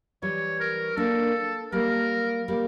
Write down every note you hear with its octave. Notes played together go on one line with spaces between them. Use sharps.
E3 G3 C#5
A#4
A#3 D4 A4
G3 A#3 A#4
G3 A#3